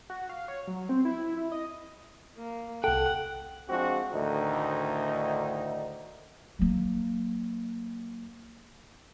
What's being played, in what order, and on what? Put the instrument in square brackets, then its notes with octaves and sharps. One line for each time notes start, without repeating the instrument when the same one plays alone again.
[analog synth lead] F#4
F5
C#5
F#3
C4
E4
E4
D#5
[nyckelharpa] A#3
[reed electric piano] C2 A4 [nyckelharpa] F#5 [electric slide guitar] G5
[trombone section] F3 G#3 C4 D4 F#4
D2 A2 D3 D#3 D#4
[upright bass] F#3 A#3